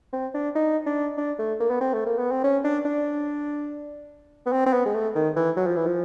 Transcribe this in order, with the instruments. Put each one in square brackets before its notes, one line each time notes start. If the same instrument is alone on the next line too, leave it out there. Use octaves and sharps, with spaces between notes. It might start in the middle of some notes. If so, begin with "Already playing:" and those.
[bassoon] C4
D4
D#4
D4
D4
A3
A#3
B3
C4
A3
A#3
B3
C4
C#4
D4
D4
B3
C4
C4
B3
G#3
A3
D#3
E3
F#3
F3
E3
F3